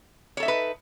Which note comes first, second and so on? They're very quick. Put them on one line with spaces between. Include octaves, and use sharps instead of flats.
C#5 A4 E5 D#4 B4